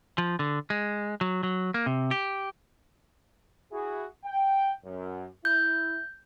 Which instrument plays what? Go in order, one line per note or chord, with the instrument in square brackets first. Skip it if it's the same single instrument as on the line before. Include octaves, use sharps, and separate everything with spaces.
[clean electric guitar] F3
D3
G#3
F#3
F#3
A#3
C3
G4
[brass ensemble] E4 F#4 G#4
G5
F#2
[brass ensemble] E4 [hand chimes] G6